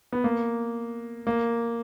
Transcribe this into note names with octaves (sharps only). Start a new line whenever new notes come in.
B3
A#3
A#3